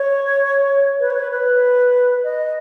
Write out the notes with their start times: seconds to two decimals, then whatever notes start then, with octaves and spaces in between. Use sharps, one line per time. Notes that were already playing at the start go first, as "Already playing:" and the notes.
Already playing: C#5
0.99 B4
1.10 C#5
1.19 B4
1.30 B4
2.23 D#5